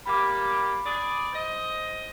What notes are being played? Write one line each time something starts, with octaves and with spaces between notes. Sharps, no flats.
G3 A#3 G4 B5 D6
G#4 D5
C5 D#5